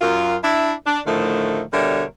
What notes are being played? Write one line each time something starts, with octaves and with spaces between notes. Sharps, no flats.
F#2 F4 A#4
D4 E4 E5
D4
A2 D3 D#3 F3 A3
B2 D3 G3 A#4 C#5 E5